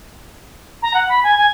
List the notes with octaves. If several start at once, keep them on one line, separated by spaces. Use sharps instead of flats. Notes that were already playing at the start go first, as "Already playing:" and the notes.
A#5
F#5
B5
G#5
G#5